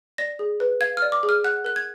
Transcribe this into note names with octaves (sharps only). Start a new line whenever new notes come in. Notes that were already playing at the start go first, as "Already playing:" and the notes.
D5 A#6
G#4
B4
F5 G#6
F6
D5
D6
G#4
F6
F#5 F#6
A#4 F#6
G#6